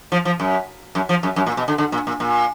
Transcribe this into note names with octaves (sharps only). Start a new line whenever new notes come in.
F3
F3
F#2
F#2
F3
F#2
F#2
A#2
B2
D3
D3
A#2
A#2
A#2